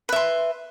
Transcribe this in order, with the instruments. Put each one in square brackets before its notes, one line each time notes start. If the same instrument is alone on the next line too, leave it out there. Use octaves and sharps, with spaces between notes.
[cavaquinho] B4
E5
C6